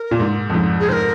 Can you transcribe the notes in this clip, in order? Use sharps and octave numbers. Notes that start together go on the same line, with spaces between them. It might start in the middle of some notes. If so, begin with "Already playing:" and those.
Already playing: A#4
A#2
G#2
F2
G#2
G#4
G#2 A#4 C5